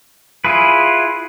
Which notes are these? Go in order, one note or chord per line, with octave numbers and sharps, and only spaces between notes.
E4 F4 G#4 B4